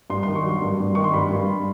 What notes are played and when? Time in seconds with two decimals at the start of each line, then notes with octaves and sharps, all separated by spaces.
0.10 G2 C6
0.23 D#3 C6
0.35 C#6
0.44 F#3 C6
0.62 G2
0.80 G2
0.95 D#3 C#6
1.04 C6
1.13 G2 B5
1.31 G2